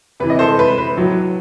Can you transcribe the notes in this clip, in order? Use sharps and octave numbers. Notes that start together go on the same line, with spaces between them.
C3 E3 B4
D#5
A4 C5
B4
B4
A2 F#3